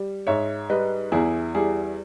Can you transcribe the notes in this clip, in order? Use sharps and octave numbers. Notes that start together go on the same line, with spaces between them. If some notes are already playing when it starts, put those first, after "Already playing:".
Already playing: G3
G#2 C#5 E5
G3 B4 D#5
E2 E4 G#4
G3 E4 G#4